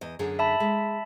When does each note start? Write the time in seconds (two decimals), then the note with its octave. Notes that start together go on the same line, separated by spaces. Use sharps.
0.01 E2 D#5
0.19 F#2 D3 G#4
0.39 E5 A5 B5
0.60 G#3